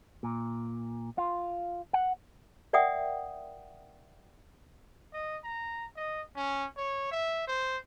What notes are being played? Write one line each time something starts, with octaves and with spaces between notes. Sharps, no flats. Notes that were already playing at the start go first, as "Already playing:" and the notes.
A#2
F4
F#5
A#4 D5 E5 F#5 G5 D#6
D#5
A#5
D#5
C#4
C#5
E5
C5